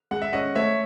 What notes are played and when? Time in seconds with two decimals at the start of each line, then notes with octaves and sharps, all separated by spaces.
0.11 G#3 F#5
0.22 E5
0.33 C#4 D#5 F#5
0.55 A3 C#5 E5